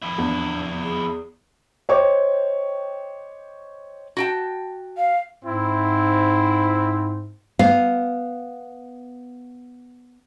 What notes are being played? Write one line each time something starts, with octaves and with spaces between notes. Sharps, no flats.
F2 E4
E2 D4
G#4
C5 C#5 D#5 G5 C#6 D6
F#4 G5 A5
F5
G#2 C4 E4
B3 F5